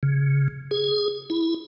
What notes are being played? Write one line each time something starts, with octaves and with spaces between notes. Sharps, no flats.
C#3
G#4
E4